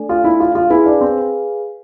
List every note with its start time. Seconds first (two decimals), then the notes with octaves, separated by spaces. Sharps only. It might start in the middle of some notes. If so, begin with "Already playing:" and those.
Already playing: A3 D4 A4 D5 G#5
0.09 F4
0.24 E4
0.40 F4
0.55 F4
0.70 E4 G#4 B4 F5 G#5
0.86 D4
1.01 C4